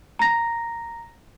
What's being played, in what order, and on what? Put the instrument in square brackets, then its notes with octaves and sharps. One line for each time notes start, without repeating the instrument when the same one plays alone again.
[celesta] A#5 A#6